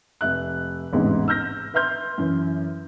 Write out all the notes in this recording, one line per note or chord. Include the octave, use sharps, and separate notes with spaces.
F1 E5 F#6
A1 E2 G#2 C3 G#3
E6 F6 G6 A#6
B4 E5 C6 F6 G6
F#2 E3